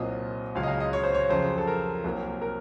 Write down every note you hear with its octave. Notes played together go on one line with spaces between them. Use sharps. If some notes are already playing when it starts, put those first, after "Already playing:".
Already playing: C2 A#2 F#3 C4 D#5
C#2 C#3 F#3 F5
D#5
F5
D#5
C#5
C5
C#5
F2 C#3 F#3 C5
A4
A#4
C2 C3 F#3 A#3
A#4